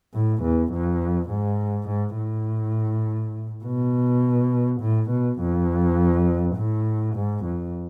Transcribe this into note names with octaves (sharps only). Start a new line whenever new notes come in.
A2
E2
F2
G#2
G#2
A2
B2
A2
B2
F2
A2
G#2
F2